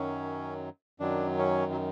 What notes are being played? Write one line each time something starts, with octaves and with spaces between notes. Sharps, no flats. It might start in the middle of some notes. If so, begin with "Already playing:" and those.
Already playing: F#2 D#3 F#3 C#4
F#2 D#3 F#3 D4
C#4
F#3